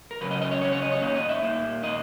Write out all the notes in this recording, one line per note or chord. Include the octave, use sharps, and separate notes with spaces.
A#4
C#3 F#3 C#4 B4
D#5
D#5
C#5
C#3 F#3 C#4 C#5
C#5
D#5
C#5
A#2 A#3 D#4 D#5
D#5
E5
A#2 A#3 D#4
A#2 A#3 D#4 D#5